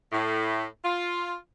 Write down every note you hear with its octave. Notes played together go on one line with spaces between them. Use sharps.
A2
F4